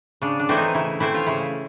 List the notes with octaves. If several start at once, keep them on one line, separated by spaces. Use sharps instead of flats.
C#3 D4
D4
E3 A3 C4 E4
D#4
C#3 E4
E3 A3 C4 E4
F4
C#3 E4